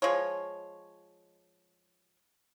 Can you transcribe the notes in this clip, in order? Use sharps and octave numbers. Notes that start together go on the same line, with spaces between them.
F3 G#3 C#5